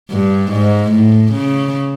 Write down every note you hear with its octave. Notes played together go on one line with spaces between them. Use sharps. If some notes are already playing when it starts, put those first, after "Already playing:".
G2
G#2
A2
C#3